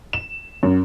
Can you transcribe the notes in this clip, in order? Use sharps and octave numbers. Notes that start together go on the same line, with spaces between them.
E7
F#2